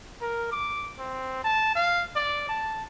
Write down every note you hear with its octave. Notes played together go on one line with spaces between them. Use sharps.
A#4
D6
C4
A5
F5
D5
A5